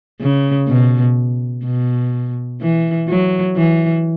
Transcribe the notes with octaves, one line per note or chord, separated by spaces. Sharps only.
C#3
B2
B2
E3
F#3
E3